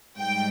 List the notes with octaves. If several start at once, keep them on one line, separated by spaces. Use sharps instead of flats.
G#2 G3 G5